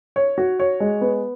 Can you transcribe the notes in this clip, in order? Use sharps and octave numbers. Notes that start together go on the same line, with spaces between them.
C#5
F#4
C#5
G#3
B3